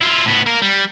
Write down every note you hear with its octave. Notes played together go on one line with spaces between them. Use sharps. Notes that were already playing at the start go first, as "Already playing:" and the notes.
E4 F4
A2 B3
A#3 A#4
G3